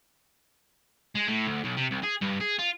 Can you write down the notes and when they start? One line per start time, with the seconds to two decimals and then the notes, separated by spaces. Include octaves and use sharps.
1.15 G#3
1.28 A2
1.47 D2
1.65 B1
1.77 C3
1.91 C2
2.04 G#4
2.22 G2
2.41 G#4
2.59 F4